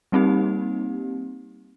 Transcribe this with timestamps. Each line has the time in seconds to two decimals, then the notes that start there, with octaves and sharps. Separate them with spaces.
0.12 G3 A#3 C4 D#4 G4